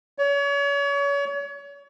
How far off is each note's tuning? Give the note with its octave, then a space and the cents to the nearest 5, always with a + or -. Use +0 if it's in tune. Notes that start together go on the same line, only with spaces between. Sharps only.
C#5 +35